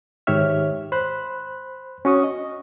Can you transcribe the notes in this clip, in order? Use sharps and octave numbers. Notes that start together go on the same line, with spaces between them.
G#2 D#3 G4 C#5 E5 F6
C5 B5 F#6
C#4 F#4 C#6 D#6
D#5